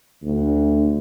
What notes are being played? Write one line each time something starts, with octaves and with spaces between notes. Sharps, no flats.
D2